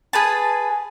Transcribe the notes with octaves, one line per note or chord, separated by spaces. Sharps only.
G#4 B4 A5